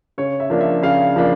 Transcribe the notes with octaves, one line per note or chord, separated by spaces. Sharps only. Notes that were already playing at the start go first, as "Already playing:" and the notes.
C#3 C#5
E5
F3 A#3 D4
E5
C#3 F5
F3 A#3 D4